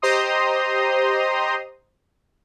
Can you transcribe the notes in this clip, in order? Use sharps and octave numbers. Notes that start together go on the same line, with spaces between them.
G4 C5 D#5 A#5 C6 D#6